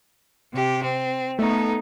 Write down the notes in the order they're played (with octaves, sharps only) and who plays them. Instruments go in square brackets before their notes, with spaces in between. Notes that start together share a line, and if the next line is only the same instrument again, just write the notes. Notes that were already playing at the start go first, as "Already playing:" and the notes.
[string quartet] C3 G4
C4
[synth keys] A3 [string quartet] B3 D#4